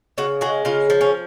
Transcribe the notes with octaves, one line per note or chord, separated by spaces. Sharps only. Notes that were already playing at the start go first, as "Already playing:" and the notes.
C#3 F#4
G#3 F#4
C#3 F4
F3
C#4